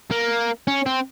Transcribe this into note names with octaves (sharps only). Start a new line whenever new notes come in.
A#3
C#4
C4